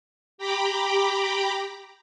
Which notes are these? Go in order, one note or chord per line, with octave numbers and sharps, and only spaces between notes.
G4 G5 A#5 B5 D6